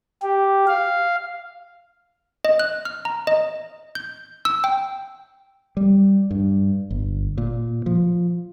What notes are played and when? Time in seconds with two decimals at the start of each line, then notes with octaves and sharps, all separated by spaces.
0.22 G4
0.67 F5
2.45 D#5
2.59 F#6
2.85 F6
3.05 A#5
3.27 D#5
3.95 G6
4.45 E6
4.64 G5
5.77 G3
6.31 G2
6.91 G1
7.38 A#2
7.86 F3